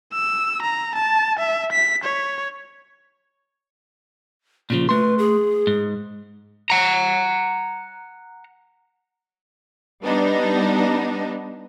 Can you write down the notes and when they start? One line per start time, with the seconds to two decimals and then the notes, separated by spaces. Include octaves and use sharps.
0.14 E6
0.62 A#5
0.95 A5
1.39 E5
1.72 B6
2.04 C#5
4.70 A#2 C#3 F3 F4
4.89 A3 B4 C6
5.18 G#4
5.67 G#2
6.70 F#5 A#5
10.03 G3 B3 D4 D#4